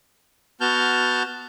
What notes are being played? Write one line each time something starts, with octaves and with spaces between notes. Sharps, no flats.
B3 F#4 A5 F6 G6